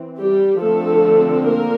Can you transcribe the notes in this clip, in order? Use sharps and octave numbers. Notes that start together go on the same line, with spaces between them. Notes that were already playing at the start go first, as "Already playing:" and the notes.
Already playing: E3 C4
G3 G4
D3 F3 A3 C4 A4
A#3 A#4